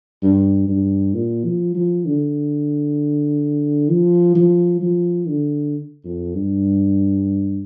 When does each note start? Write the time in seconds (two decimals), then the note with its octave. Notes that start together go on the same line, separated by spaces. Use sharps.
0.22 G2
0.68 G2
1.14 A#2
1.45 F3
1.75 F3
2.05 D3
3.89 F3
4.35 F3
4.81 F3
5.27 D3
6.04 F2
6.35 G2